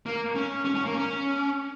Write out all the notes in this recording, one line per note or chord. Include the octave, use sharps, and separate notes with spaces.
A#3
C#4
C#4
C#4
A#3
C#4